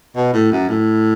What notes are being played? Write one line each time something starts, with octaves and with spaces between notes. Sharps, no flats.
B2
A2
F#2
A2